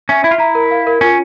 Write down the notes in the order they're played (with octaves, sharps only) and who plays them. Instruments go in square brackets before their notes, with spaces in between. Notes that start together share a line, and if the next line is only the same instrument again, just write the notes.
[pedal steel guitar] C#4 [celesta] E5
[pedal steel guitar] E4 [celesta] E5
[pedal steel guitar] F4
[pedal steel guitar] E4 [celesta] A#5
[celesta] A#4
F5
A#4
[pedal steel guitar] C#4 [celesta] F4